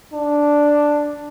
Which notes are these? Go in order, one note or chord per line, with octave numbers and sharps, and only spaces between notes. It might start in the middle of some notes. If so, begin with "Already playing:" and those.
D4